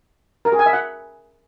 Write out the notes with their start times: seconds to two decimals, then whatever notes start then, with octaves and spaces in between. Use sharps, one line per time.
0.45 A#4
0.52 G#4
0.59 G#5
0.66 E5
0.73 F#5